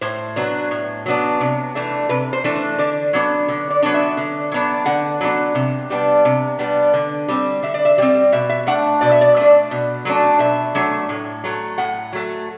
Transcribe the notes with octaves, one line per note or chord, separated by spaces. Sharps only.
A2 C5
F#3 B3 D4
A2
F#3 B3 D4
C3
E3 A3 D4
C3 B4
C5
E3 A3 D4
C5
D3 D5
F#3 B3 D4
D3
D5
F#3 B3 D4
E5
D3
F#3 B3 D4
D3 F#5
F#3 B3 D4
C3
G3 B3 D4
C3
G3 B3 D4
D3
G3 C4
D3 E5
D5
E5
G3 C4 D5
B2 E5
E5
A3 D4 F#5
B2 D5
E5
D5
A3 D4
B2
F#3 A3 D4
B2 E5
F#3 A3 D4
A2
F#3 A3
A2 F#5
F#3 A3